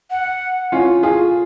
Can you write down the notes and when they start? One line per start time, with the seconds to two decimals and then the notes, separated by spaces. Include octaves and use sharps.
0.11 F#5
0.72 C#4 F4
1.03 F4 G#4